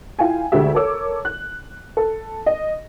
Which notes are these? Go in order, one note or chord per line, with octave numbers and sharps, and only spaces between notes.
E4 F4 F5 G5 G#5
D2 D3 G#3 G4 E5
A4 A#4 C#5 D6 E6
F#6
A4
D#5